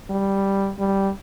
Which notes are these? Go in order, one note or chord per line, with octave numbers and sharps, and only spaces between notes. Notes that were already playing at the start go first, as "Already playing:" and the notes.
G3
G3